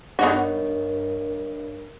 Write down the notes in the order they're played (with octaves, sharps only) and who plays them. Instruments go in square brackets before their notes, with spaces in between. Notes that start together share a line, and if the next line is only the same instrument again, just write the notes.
[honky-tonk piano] G2 [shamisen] B3 D#4 F#4 [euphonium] A#4 [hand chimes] C#5 D#5